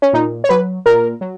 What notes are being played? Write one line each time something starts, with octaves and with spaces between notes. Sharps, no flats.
C#4
A#2 D#4
C#5
F#3 B4
A#2 A#4
F#3